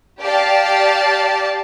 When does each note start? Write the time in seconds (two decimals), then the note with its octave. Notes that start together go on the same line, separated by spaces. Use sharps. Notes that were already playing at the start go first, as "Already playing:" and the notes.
0.22 G4 D5 F5 A5